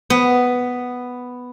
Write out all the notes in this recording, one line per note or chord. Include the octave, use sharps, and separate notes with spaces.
B3